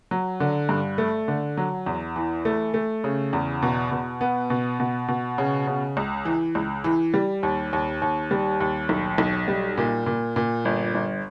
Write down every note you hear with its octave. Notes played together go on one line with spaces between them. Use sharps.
F#3
D3
G2
A3
D3
F#3
E2
E3
A3
A3
C#3
E2
B2
B2
B3
B2
B2
B2
C#3
C#3
C#2
E3
C#2
E3
G3
D#2
D#2
D#2
G3
D#2
B1
B1
G3
A#2
A#2
A#2
G1
G1